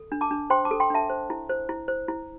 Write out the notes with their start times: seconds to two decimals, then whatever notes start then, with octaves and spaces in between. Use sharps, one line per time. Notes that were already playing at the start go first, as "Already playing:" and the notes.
Already playing: A4
0.12 D4
0.21 A5 D6
0.31 D4
0.50 C5 G5 C6
0.65 A5 D6
0.71 A4
0.80 G5 C6
0.90 D4 E5 A5
1.10 C5
1.30 E4
1.50 C5
1.69 E4
1.88 C5
2.08 E4